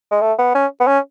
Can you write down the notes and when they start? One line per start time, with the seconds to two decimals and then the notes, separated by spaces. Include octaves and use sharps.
0.11 G#3
0.22 A3
0.38 B3
0.55 C#4
0.80 B3
0.87 C#4